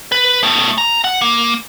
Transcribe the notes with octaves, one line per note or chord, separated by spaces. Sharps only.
B4
A3 B3
A#5
F#5
A#3